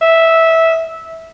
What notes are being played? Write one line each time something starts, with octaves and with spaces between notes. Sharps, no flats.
E5